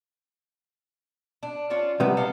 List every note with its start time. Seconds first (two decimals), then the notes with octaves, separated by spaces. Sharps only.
1.43 D4
1.70 C#4 D4 F4
2.00 C3 G3 B3 E5
2.17 D#4 A4 F5